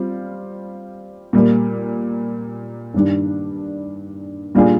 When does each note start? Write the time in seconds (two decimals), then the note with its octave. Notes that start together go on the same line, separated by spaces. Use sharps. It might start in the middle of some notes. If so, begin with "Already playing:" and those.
Already playing: G3 C4 F4
1.33 A#2 G3 A#3
2.94 G2 D#3 G3 D4
4.55 A#2 G3 D4 F4 G#4